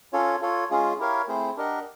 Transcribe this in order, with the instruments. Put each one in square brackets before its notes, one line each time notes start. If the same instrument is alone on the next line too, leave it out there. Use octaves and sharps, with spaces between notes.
[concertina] C#4 F4 A4 C#5
F4 A4 C#5
G#3 C#4 F4 G#4
E4 G4 A#4 C#5 F5
A3 C4 E4 G#4 C5
D4 G4 A#4 D#5 F#5